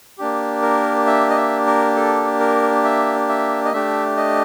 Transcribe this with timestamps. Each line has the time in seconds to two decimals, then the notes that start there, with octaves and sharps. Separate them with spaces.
0.18 A#3 D4 G4
0.62 A#4
1.07 E5
1.30 D#5
1.37 E5
1.66 A#4
1.96 A4
2.40 A#4
2.84 E5
3.29 E5
3.65 D#5
3.73 A3 D4 G4 E5
4.17 D#5